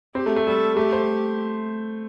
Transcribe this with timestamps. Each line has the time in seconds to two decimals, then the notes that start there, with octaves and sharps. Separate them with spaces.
0.15 C4 G4
0.26 A3
0.36 A3
0.46 G3 A4
0.76 A3 G4
0.92 C5